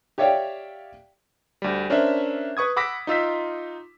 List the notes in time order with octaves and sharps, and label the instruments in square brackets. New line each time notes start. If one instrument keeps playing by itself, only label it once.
[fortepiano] G4 C#5 D5 E5 F5 G5
[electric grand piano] D2 G3
C#4 D4 A#4 C5 E5
B4 C#6 D#6 G#6
F#5 B5 D6 E6 A#6 B6
D#4 F4 E6 B6